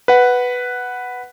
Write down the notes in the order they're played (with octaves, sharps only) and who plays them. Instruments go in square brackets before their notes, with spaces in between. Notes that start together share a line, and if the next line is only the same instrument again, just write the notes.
[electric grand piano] B4 F#5